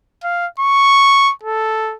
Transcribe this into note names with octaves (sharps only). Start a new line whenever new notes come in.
F5
C#6
A4